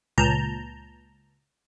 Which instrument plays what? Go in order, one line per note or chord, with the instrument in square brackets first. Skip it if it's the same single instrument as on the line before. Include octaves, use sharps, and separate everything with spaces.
[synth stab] C#2 A#2 A5 A#5 G6